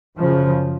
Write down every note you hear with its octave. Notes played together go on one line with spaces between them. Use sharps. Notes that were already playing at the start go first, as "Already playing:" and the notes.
F#2 C#3 F3